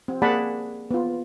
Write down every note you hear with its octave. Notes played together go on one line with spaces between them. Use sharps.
C4
A#3 G#4 D5 F#5 A5 B5
B3 F4